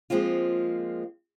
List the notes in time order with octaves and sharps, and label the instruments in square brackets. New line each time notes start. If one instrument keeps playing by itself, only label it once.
[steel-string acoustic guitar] F3 G#3 A#3 C4 F4